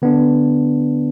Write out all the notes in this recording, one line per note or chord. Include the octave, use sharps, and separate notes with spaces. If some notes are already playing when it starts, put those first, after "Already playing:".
D3 B3 D4